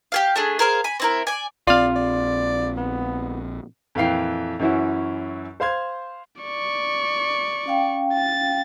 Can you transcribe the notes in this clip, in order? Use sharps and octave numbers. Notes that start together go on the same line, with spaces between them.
G4 G#4 F5
A3 D4 G#4
G#4 A#4 C5 F5
G#5 B5
C4 E4 A#4
D5 G#5
A#1 C4 F4 D5 F5
D5
B3
F2 A#2 E3 F5 G5 C7
F#2 E3 C#4 E4 F#4
C5 F5 C6 G#6
D5 C#6
C#4 F5 G5
A6